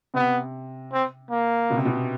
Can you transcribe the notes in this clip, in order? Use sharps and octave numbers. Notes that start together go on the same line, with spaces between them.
C3 B3
C4
A#3
B2
C3
B2